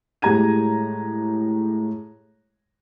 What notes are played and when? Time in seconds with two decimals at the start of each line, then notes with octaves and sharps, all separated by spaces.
0.22 A2 G#3 G4 A#5 G#6 D#7